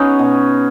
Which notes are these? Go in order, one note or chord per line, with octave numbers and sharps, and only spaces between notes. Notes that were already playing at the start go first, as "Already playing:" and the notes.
Already playing: B3 C#4 D#4 F#4 G#4
B2